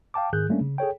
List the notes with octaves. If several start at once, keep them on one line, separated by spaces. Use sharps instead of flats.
F5 G5 A5 D6
G#2 D#3 G#4 F#6 G6
G3 A3 A#3 C#4 D4
C#3
G#4 A4 C#5 G5